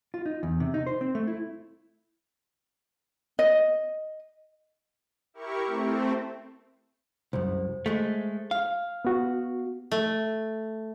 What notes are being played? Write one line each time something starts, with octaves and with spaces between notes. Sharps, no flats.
F4
D#4
E2
C3
D#4
C5
C4
A3
E4
D#5
E4 G4 A#4 C#6
A3 C4
C2 F#2 C5
G#3 A3
F5 F6
B3 F#4
A3